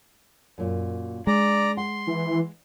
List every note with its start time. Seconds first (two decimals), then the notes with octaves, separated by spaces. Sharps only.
0.58 F#2 A#2
1.27 G#3 D4 D5 A#5
1.77 F#5 C6
2.07 E3